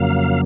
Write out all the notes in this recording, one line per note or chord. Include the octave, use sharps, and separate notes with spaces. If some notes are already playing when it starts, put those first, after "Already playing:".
Already playing: F2 C#3 F#3 A#3 F5